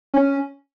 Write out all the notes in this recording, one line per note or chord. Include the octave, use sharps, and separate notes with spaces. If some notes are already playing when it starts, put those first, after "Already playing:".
C#4